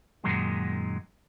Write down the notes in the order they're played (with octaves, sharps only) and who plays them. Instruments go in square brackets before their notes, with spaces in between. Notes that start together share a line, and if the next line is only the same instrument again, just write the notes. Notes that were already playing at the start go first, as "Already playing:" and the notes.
[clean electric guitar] F#2 A#2 D#3 F#3 G#3 D#4